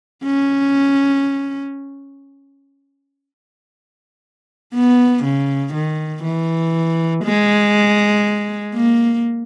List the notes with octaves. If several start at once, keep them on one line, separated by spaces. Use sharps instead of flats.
C#4
B3
C#3
D#3
E3
G#3
A#3